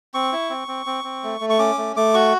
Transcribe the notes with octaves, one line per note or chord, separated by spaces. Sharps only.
C4 C#6
E4
C4
C4
C4
C4
A3
A3
C#6
C#4 D6
A3
A3 D6
F#4 C#6